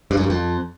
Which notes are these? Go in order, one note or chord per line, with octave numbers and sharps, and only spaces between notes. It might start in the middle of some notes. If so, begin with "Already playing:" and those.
G2
F#2
G2
F2